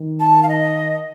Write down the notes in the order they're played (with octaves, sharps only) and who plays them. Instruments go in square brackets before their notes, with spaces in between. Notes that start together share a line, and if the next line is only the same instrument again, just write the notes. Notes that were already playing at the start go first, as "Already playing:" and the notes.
Already playing: [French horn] D#3
[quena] A5
F5
D#5